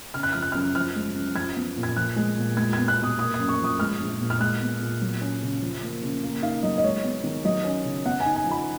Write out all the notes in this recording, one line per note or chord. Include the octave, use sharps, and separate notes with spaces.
C#3 F6
F#6
F3 F6
F#6
F#2 F6
F3 F6
G#3
F#2
F3 G#6
B3
A#2
G#6
F3 F#6
G#3
A#2
G#3 G#6
B3 G#6
F#6
B2 D#6
A#3 D#6
F#2 D#6
C#6
F3
D#6
G#3 F6
A#1
A#2
F6
G#3 F#6
B3
A#2
F#3
C#4
C#3
F3
A#3
C#3
A#3
D#4 F5
F#3 D#5
D#5
G#3 C#5
B3
D#3
F#3 D#5
C#4
C#3
B3 F#5
G#5
D#4
G#5
F3
B5